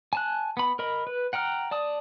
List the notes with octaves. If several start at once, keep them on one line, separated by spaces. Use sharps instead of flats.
G#5 A5 F#6
B3 B5
A#4 D#5 B5
B4
F#5 G5 A#5 F6
D5 A5 D#6